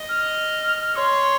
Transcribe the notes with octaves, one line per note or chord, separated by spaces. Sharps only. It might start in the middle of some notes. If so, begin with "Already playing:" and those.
Already playing: D#5
F6
C#5 C6